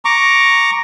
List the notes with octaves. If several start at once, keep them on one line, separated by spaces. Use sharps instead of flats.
A#5 C#6 D6